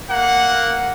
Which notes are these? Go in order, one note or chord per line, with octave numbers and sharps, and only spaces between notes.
A#3 F#5